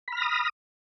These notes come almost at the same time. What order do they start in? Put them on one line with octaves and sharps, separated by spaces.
B5 F6 A#6 D#6